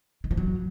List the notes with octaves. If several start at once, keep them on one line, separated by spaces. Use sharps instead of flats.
D#3
F3
F#3